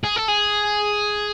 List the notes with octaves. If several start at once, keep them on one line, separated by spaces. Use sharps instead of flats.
G#4
A4
G#4